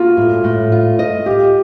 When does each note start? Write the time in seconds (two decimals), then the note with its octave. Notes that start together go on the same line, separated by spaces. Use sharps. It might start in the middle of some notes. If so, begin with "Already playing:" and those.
Already playing: A#3 F4 F#4
0.17 A2
0.44 A2
0.72 F4
0.99 D#5
1.26 F4 G4